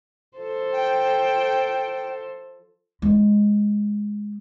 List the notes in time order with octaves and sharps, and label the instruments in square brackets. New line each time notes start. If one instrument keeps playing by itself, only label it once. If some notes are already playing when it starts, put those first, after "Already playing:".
[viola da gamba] F3 A4 C5
[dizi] G5
[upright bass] G#3 D#4